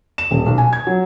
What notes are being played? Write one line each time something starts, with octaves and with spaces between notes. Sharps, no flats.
E7
D#1
B1
G#5
G#6
F#3